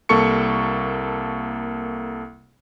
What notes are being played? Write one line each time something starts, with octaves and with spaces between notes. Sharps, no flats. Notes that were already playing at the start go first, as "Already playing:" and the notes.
C2 A#3 A4 C#6 C#7